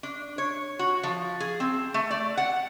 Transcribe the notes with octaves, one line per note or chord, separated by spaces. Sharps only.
D4
C#5
F#4
F3
G#4
C4
A3
D5
F#5